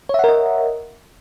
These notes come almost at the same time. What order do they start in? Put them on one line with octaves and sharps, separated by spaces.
C#5 E5 F#5 A#4 D#5